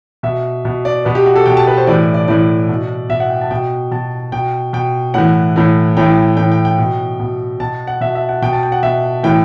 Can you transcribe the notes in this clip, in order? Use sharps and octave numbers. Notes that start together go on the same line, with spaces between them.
B2 E5
B2
D5
B2 B4
G4
F#4
A4
B2 G5
A5
B4
C5
A2 E3 D5
D5
A2 E3 D5
B2
B2 E5
F#5
G5
A5
B2 G5
B2 A5
B2 G5
B2 G5
A2 E3 F#5
A2 E3
A2 E3 G5
A2 E3 G5
G5
G5
B2
B2
B2 A5
F#5
B2 E5
E5
F#5
B2 G5
A5
G5
F#5
B2 E5
A2 E3 G5